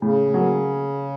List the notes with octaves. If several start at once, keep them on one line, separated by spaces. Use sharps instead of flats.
A2 C#3
F#3 A#3